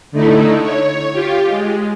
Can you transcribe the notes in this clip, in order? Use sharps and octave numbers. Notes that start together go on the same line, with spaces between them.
D3 A3 D#4 E4
C#5
F4 G4
G#3